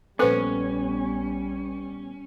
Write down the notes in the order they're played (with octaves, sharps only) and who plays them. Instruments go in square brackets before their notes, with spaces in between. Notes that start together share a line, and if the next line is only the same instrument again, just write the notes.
[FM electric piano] A#1 B3 G#5 [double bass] G3 [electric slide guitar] C#4 [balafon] A4 B4 C5